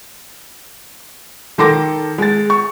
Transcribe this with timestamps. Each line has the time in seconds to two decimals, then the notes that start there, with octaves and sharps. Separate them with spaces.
1.58 D#3 A4 C6 D6 A#6
2.18 G#3 A6
2.50 C#6